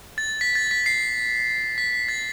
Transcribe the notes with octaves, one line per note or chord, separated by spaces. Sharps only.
A6
B6
A6
B6
C7
B6
B6
A6